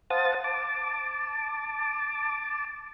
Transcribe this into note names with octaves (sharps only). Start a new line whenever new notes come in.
C5 F5 F#5 A5 D#6 A6
A5 D6